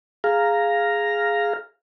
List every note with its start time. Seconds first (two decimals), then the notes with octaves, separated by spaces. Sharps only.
0.24 G#4 F5 A#5